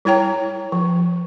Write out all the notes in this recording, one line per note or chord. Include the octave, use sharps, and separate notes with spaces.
G3 E4 C#5 G5 A#5
F3